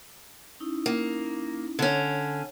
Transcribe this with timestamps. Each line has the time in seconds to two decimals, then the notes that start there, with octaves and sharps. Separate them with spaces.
0.60 C#4 D#4 E4
0.86 A#3
1.79 D3 C#4